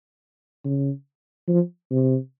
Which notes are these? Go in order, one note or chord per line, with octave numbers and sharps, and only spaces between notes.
C#3
F3
C3